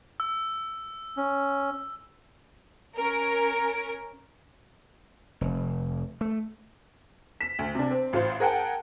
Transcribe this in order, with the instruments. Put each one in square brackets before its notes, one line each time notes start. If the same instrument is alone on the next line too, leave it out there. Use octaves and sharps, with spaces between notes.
[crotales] E6
[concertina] C#4
[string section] C#4 A#4
[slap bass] F1
A3
[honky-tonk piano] B6 E7
D2
C3 D4
C4
A1 F4 C5
G#4 A#4 F#5 G5 A5